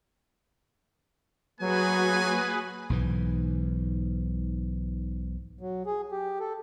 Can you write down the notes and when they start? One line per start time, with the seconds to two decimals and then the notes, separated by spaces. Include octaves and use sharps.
1.60 F#3 A#3 F#4 G#4 B4 G#5
2.90 B1 G#2 E3
5.61 F#3
5.86 G#4
6.12 G4
6.40 A4